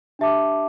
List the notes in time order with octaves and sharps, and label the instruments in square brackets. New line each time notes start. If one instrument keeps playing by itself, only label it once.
[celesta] D4 G4 E5 A5 D6